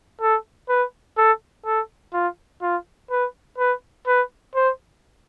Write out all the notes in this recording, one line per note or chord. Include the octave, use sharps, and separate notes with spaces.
A4
B4
A4
A4
F4
F4
B4
B4
B4
C5